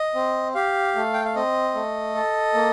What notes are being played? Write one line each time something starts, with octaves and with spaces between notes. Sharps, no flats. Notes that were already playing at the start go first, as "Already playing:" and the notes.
Already playing: D#5
C4
G4 F5
A3
G5
F5
C4 D#5
A3
A4
A#3